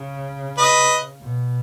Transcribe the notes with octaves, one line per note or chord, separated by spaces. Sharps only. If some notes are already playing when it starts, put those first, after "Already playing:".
Already playing: C#3
B4 D#5
B2